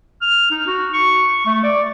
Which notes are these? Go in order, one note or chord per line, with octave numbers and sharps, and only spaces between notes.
F6
D#4
F#4
C#6
A3
D5